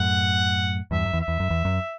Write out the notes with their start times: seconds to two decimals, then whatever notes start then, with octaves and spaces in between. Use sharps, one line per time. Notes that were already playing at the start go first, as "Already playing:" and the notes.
Already playing: F#2 A2 F#5
0.91 E2 G2 E5
1.06 F#2
1.13 E2
1.21 E5
1.28 E2
1.40 F#2
1.50 E2
1.65 F#2